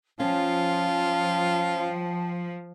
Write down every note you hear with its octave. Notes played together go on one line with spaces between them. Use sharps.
F3 C#4 F4 G5 A5